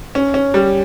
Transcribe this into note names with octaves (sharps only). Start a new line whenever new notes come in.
C#4
C#4
G3